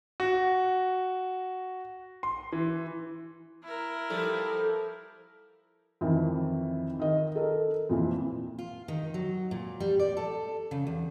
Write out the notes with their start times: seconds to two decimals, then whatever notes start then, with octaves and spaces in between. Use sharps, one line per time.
0.20 F#4
2.23 C6
2.53 E3
3.64 E4 A#4
4.10 F3 G3 A4
6.01 F2 D#3 E3
7.00 D#3 D#5
7.35 A4 A#4
7.89 F2 A#2 E3
8.59 F4
8.88 D#3
9.14 F#3
9.51 A#2
9.80 G3
9.99 D5
10.17 A4
10.71 C#3
10.87 E2